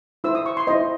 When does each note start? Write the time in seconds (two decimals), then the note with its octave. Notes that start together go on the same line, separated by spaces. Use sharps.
0.24 E4 C5 E6
0.35 D#6
0.46 C#6
0.57 C6
0.67 E4 C5 D#5